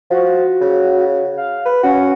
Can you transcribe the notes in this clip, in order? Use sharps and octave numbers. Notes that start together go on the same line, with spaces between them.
F3 F#4
C#3
F5
B4
C#4 F#4